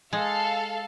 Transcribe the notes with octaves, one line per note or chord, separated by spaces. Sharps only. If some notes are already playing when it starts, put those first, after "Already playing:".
G#3 A4 F5